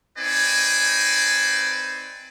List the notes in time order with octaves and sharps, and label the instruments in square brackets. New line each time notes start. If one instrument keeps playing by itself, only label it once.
[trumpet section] C4 D#4 B4 D5 G#5